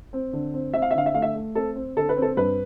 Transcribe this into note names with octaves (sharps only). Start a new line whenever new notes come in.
C4
D3
C4
C4 E5
F5
E5
D3 F5
E5
A3 F5
E5
A3
C4 A4
C4
D3 A4
B4
C4
A4
G2 B4